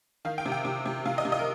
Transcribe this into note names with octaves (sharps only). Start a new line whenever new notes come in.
D#3 F5
G5
C3
G5
C3
C3
C3 F5
D#5
C3
D#5
A#4